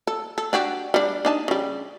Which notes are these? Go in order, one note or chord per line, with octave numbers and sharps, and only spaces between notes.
A4
A4
D4 F#4 G4
G3 D4
D4 D#4 A5
C#3 G3